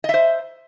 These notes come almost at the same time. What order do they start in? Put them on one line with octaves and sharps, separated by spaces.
D#5 E5 C5